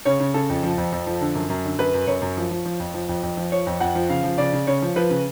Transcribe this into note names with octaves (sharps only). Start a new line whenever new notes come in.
C#3 C#5
C#3
C#3 A4
F2
F3
F2
F2
F3
D3
F#2
F#2
D3
F#2 B4
F#2
F#2 C#5
F#2
F3
F3
F3
F2
F3
F2
F2
F3
F3 C#5
F2
F2 F#5
F3
C#3 F5
F3
C#3 D5
C#3
C#3 C#5
F3
F3 B4
C#3